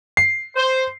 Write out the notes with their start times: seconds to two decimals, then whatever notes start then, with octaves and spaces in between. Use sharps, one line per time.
0.17 C7
0.56 C5